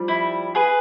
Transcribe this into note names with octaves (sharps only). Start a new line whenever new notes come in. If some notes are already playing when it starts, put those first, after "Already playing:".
Already playing: F3 G3
E4
G#4 B4